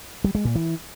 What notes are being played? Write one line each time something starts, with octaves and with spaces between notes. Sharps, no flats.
G3
G#3
A#2
E3